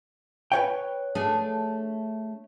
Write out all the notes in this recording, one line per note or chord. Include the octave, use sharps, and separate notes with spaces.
B4 C#5 G5
A3 D4 G#4